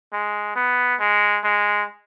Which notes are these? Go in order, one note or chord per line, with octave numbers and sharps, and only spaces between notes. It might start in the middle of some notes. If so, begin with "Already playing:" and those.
G#3
B3
G#3
G#3